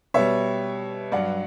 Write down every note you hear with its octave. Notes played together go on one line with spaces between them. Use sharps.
B2 G3 C#5 E5
G2 F#3 D5 F#5